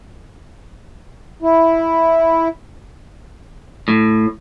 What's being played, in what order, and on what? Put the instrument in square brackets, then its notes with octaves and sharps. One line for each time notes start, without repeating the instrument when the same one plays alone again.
[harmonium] E4
[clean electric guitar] A2